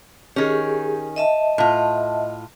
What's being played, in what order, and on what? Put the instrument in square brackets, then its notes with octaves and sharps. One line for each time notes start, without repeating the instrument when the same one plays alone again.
[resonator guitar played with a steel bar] D#3 C#4 [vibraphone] G4 G#4
[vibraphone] D#5 E5 A5
[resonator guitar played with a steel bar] A2 F4